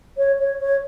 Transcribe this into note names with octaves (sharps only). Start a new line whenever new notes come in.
C#5
C#5
C#5